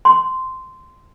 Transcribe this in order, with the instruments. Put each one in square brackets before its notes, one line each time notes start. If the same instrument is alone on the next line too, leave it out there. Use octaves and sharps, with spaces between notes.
[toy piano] C6